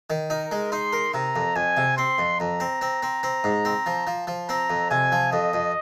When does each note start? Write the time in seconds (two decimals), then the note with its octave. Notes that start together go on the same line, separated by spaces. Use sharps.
0.10 D#3
0.30 D#4 A#4
0.51 G#3
0.72 D#4 C6
0.93 A#4
1.14 C3 A#5
1.36 F2
1.56 F2 G#5
1.77 C3
1.97 C4 C6
2.18 F2
2.40 F2 A#5
2.60 C4
2.81 C4
3.03 C4
3.23 C4
3.44 G#2
3.65 C4
3.86 F3
4.07 F3
4.27 F3
4.49 C4 A#5
4.70 F2
4.90 C3 G#5
5.12 F3
5.32 F2 D#5
5.54 F2